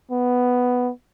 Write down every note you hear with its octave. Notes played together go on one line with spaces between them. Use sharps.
B3